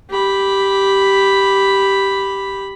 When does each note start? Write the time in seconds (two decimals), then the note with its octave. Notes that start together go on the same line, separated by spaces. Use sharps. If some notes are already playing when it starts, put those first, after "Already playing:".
0.10 G4 B5